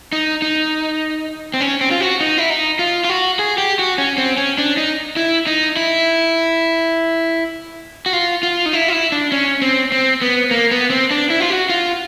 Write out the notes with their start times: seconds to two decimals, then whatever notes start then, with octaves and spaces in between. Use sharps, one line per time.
0.12 D#4
0.42 D#4
1.54 C4
1.61 C#4
1.81 C4
1.91 F4
2.01 F#4
2.21 D#4
2.38 E4
2.50 D#4
2.79 F4
3.05 F4
3.10 F#4
3.39 G#4
3.58 G4
3.79 F#4
3.98 C#4
4.18 C4
4.38 C#4
4.58 D4
4.77 D#4
5.17 E4
5.47 D#4
5.76 E4
8.06 F#4
8.13 F4
8.43 F4
8.66 D#4
8.73 E4
8.88 F4
8.93 E4
9.12 D4
9.32 C#4
9.62 C4
9.92 C4
10.22 B3
10.51 A#3
10.71 B3
10.90 C4
11.11 D4
11.30 E4
11.40 F4
11.50 F#4
11.70 F4